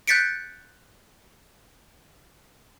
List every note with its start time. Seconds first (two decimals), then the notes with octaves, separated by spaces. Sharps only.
0.08 F#6 G6 A6 B6 C#7 D7